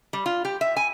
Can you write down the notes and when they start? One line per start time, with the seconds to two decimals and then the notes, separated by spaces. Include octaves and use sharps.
0.13 G3
0.26 F4
0.45 G4
0.61 E5
0.76 G#5